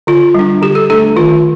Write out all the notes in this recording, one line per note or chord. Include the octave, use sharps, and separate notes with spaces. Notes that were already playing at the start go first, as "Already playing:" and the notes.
D3 F4
G3 D4
D3 G4
A4
A3 D4 A4
D#3 F4